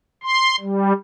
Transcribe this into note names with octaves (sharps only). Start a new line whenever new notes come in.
C6
G3